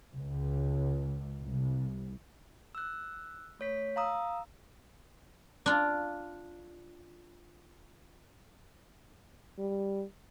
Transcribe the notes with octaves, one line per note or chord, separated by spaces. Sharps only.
C#2
C2
E6 F#6
A3 C#5 B6
F5 A#5 D#6 E6
D4 F4
G3